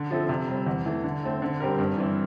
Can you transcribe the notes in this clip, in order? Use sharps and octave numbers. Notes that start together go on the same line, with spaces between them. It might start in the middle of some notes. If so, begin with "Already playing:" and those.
Already playing: D3
F3 C4 E4 A4
C3
G3 C4
E2
E3 A3
D3
A3 C4
D3
G3 C4 G4 A#4
G2
E3 G3 C4